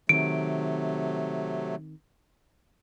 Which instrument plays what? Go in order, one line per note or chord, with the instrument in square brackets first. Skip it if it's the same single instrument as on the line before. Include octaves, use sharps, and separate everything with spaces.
[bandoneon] C3 F#3 A3 [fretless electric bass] D#3 C4 [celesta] D7